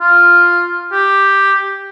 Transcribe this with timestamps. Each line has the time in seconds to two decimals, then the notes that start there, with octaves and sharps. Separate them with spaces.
0.01 F4
0.92 G4